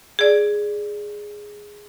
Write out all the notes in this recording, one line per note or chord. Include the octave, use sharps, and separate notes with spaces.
G#4 D5